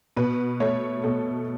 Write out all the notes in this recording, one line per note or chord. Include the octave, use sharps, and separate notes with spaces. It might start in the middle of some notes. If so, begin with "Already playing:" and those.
B2 B4
A3 C#5
B2 A4